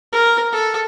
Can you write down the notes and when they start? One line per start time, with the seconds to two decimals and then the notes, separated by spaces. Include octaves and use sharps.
0.12 A#4
0.52 A4